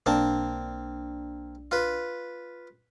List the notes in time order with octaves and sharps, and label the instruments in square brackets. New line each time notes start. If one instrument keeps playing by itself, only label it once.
[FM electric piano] B1 D4 [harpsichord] A#3 C4 A5
[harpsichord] F4 B4